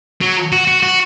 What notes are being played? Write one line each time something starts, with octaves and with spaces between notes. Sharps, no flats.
F#3
F#4
F#4
F#4